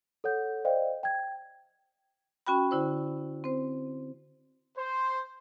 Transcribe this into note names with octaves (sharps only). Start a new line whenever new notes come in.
A4 C#5 F#5 G6
C5 D5 D#5 F5 G5
G5 G#6
C#4 F#4 G5 B5
D3 E4 C5
C4 C5
C5